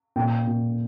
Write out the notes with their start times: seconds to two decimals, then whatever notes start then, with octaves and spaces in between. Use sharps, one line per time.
0.16 A#2 G5
0.47 A#2